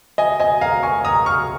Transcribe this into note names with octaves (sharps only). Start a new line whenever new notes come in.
D#5 G#5
D#5 G#5
F5 A#5
G#5 C#6
A#5 D#6
C#6 F6